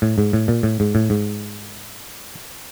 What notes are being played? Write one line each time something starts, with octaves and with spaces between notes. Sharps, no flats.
A2
G#2
A2
A#2
A2
G#2
A2
G#2